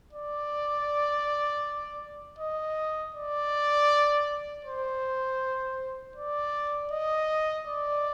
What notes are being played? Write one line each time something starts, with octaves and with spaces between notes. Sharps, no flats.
D5
D#5
D5
C5
D5
D#5
D5